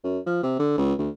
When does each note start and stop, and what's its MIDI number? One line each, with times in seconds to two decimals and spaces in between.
0.04 0.19 42
0.26 0.40 53
0.43 0.58 48
0.59 0.74 50
0.78 0.94 37
0.99 1.10 38